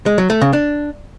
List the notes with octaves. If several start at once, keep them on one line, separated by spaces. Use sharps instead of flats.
G#3
F#3
A3
C#3
D4